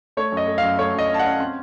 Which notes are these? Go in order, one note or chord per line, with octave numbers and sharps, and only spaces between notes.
A3 C#5
F#2
D#5
A3
F5
F#2
A3 C#5
F#2 D#5
C#4
A5
F#5
C#4
C4